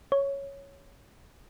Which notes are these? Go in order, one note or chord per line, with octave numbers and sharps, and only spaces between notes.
C#5